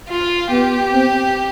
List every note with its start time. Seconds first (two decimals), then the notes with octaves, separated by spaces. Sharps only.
0.08 F4
0.50 B3 G4
0.93 C4